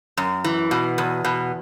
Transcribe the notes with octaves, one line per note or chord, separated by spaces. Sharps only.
F#2
E3
B2
E2
B2